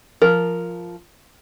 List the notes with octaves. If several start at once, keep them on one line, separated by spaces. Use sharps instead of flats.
F3 A#4